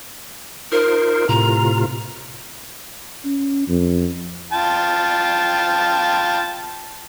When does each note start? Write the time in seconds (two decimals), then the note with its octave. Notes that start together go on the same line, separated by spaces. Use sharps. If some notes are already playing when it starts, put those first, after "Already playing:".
0.72 D#4 F4 A#4 C5
1.29 A2 C3 F4 A#5
3.25 C#4
3.68 F2
4.53 F4 G5 A5